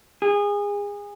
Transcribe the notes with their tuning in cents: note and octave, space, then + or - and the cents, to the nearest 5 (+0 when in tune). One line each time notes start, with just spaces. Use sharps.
G#4 -25